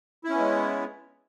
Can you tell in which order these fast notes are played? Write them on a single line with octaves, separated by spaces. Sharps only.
E4 C#4 B3 G#3